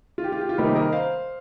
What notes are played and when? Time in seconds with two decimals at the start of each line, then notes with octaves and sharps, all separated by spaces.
0.18 F4
0.24 G4
0.32 F4
0.41 G4
0.49 F4
0.58 C3 D#3 G3 A#3 D#4 G4
0.75 A#4 D#5
0.92 C5 F5